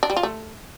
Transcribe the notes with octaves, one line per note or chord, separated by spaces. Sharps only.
D4
G3
F4
A3